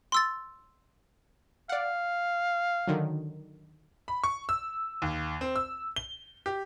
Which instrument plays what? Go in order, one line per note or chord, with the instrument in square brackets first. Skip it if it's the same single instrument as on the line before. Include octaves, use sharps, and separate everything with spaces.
[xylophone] C6 E6 A6
[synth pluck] D5 F#5 [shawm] F5
[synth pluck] D3 D#3 F#3
[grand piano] B5
C#6
E6
D#2
C4
E6
G7
G4